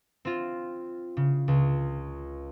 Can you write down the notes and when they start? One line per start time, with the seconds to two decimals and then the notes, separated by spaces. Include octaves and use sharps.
0.25 C4 F4
1.17 C#3
1.48 C#2